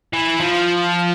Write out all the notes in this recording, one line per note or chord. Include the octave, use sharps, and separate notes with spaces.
E3
F3